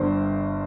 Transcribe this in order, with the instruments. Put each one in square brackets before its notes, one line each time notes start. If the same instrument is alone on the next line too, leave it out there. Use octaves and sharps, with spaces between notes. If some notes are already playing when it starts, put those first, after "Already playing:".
Already playing: [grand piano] G1 G2 D3 C5